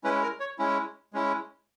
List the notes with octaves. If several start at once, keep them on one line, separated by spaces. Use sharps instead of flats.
G#3 C#4 E4 B4
A#4
C#5
G#3 C#4 E4
G#3 C#4 E4